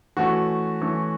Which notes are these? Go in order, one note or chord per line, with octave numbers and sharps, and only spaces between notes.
E3 A3 C#4 F#4
E3 A3 C#4